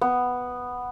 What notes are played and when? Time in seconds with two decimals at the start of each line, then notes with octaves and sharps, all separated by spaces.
0.01 B3